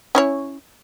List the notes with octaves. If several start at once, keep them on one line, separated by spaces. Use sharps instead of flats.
C#4 E4 C#5